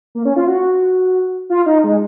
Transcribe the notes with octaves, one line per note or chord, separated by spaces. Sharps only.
A#3
C#4
F4
F#4
F4
D#4
G#3